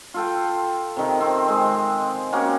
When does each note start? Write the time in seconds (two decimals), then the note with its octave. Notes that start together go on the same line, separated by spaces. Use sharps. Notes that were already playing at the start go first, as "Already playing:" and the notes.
0.14 F4 A4 G5
0.97 C3 D#3
1.21 C4
1.48 G#3
2.32 A#3 C4 C#4 F#4